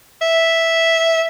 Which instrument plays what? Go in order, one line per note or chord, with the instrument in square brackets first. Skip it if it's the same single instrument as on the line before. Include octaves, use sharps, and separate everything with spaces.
[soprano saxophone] E5